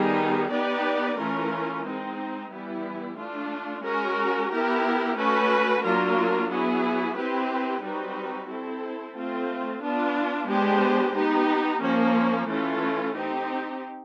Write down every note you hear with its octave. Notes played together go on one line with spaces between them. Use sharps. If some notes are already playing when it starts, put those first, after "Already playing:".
Already playing: D#3 G3 B3 D#4 G#4
B3 D#4 G4 B4 D5
E3 A3 C#4 F4 A#4
G#3 C4 D#4
E3 G3 B3 E4
A3 D4 F4
G#3 C#4 F#4 A#4
B3 E4 G4 A#4
A3 C#4 F#4 B4
F#3 A#3 D4 F4 A#4
F#3 B3 E4 G#4
C4 E4 G4 B4
G3 C4 D#4 F#4 B4
C4 E4 A4
A3 C4 F4
B3 D4 F4
G#3 B3 D4 G4 C5
B3 D#4 G4
F3 A#3 C#4
E3 A3 C#4 F4 A4
C4 D#4 G4